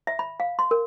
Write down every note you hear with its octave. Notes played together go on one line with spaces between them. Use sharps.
E5
B5
F5
C6
A#4